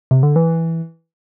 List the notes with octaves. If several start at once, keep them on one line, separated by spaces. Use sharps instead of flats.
C3
D3
E3